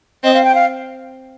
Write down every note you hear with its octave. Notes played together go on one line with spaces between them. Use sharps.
C4 D#5
F5
G5
F5